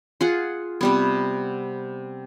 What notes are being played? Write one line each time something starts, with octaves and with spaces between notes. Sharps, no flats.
F4 G#4 F#5
C3 G3 B3